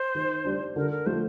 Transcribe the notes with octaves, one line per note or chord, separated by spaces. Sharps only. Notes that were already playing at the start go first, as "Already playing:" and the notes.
Already playing: C5
D#3
G3 D4
D3 A#4
A#4
F3 A3 C5